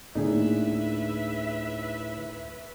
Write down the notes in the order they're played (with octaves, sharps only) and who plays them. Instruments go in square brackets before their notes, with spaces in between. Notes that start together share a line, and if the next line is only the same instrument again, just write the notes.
[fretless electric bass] D1 A#3 [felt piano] A2 D3 [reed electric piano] D#4 G#4 [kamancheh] B4 E5